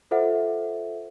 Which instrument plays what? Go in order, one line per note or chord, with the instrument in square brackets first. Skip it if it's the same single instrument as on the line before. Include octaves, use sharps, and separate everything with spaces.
[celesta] F4 A4 C5 E5 F#5